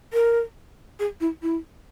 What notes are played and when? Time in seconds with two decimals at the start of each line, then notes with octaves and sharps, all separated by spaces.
0.13 A#4
1.00 G#4
1.21 E4
1.43 E4